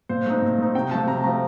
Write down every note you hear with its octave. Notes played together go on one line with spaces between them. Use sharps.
A#2 C5
A3 C4 D#4
A#2
A3 C4 D#4
C3 G5
F3 A3 A5
C3 A#5
F3 A3 A#5